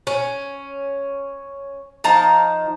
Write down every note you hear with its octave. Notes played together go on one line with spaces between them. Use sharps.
C#4
F3 D#4 A5 A#5